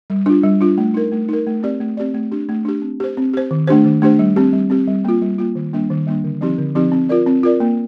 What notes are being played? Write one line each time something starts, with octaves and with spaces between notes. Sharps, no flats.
G3
D4 F4
G3
D4 F4
A3
D#4 A#4
A3
D#4 A#4
A3
C4 G4 D5
A3
C4 G4 D5
A3
D4 G4
A3
D4 G4
C4
G4 C5
C4
G4 C5
D#3
A3 D4 G4 C5
D#3
A3 D4 G4 C5
G3
C4 G4
G3
C4 G4
G3
A#3 F4
G3
A#3 F4
D#3
G3 A#3 D4
D#3
G3 A#3 D4
D3
F3 C4 D#4 G4
D3
F3 C4 D#4 G4
C4
F4 A#4 D5
C4
F4 A#4 D5
A#3